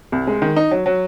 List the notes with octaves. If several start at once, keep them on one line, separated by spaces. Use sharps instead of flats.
C2
G#3
D#3
D#4
F#3
F#3